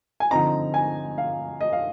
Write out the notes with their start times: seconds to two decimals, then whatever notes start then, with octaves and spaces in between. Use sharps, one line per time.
0.20 G#5
0.31 D3 F3 C4 D#4 A#5
0.74 G#5
1.18 F5
1.61 D#5
1.73 F5